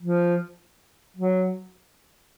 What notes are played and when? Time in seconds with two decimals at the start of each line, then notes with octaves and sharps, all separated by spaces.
0.01 F3
1.17 F#3